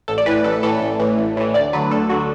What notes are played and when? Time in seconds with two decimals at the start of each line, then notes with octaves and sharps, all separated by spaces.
0.08 A1 A4
0.18 D5
0.26 A2 E3 B4
0.44 A1 A4
0.63 A2 E3 A4
0.81 A1
0.99 A2 E3
1.18 A1
1.37 A2 E3
1.54 D2 D5
1.73 D3 F#3 B4
1.91 D2 A4
2.10 D3 F#3 F#4